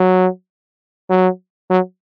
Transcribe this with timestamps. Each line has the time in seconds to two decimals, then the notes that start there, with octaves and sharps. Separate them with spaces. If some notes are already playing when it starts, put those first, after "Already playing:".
Already playing: F#3
1.10 F#3
1.70 F#3